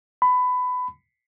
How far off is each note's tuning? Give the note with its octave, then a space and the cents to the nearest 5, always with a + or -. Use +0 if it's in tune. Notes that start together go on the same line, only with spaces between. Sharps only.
B5 +20